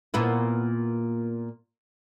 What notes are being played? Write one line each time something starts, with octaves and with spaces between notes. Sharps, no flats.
A#2 B3 E4